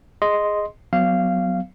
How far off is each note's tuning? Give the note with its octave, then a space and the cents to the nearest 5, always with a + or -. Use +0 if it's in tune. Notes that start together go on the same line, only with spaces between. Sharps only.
G#4 +0 D#5 +0 C6 -5
F#3 +0 B3 +25 F5 -15